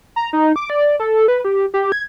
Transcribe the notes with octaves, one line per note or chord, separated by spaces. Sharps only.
A#5
D#4
D6
D5
A4
B4
G4
G4
G#6